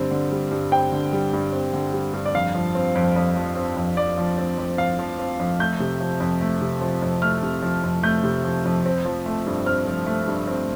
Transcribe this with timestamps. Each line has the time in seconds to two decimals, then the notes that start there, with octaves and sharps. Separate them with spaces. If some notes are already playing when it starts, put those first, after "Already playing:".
Already playing: G2 D3 G3 C4
0.11 D3
0.31 G3
0.51 G2
0.72 C4 G5
0.92 D3
1.13 G3
1.33 G2
1.53 C4
1.74 D3
1.93 G3
2.14 G2
2.25 D5
2.34 F2 F5
2.55 F3
2.75 C4
2.95 F2
3.16 F2
3.36 F3
3.56 C4
3.77 F2
3.97 F2 D5
4.17 F3
4.38 C4
4.58 F2
4.78 F2 F5
4.99 F3
5.19 C4
5.40 F2
5.59 A3 G6
5.80 C3
6.00 F3
6.20 F2
6.41 A3
6.61 C3
6.81 F3
7.02 F2
7.22 A3 F6
7.43 C3
7.62 F3
7.84 F2
8.03 A3 G6
8.23 C3
8.44 F3
8.65 F2
8.86 C4
9.05 F3
9.26 A3
9.46 G2
9.66 C4 F6
9.87 F3
10.06 A3
10.28 G2
10.48 C4